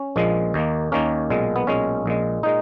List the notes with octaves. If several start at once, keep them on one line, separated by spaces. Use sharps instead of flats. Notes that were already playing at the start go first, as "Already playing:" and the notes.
Already playing: C#4
A#1 A#2 F3 G#3
D#2 D#3 A#3
D#2 D#3 A#3 C#4
B1 A#2 G#3
B3
B1 A#2 G#3 C#4
A#1 A#2 G#3
A#2 G#3 D#4